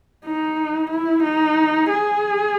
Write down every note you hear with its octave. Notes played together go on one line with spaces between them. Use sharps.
D#4
E4
D#4
G#4